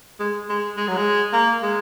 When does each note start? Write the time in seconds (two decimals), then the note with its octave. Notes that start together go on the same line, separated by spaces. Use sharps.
0.20 G#3
0.49 G#3
0.77 G#3
0.88 F#3
0.97 G#3
1.33 A#3
1.62 G#3